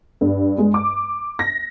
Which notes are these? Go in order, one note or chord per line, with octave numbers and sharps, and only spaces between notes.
G2
G#3
D6
A#6